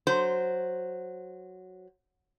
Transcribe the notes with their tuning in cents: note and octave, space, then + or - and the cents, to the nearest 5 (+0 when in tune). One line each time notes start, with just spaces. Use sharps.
F#3 +0 C5 +0